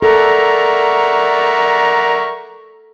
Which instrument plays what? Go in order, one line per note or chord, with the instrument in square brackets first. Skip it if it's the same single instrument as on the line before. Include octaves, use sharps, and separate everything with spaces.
[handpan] A4 [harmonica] A#4 E5 C#6 [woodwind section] D5 F#5 A#5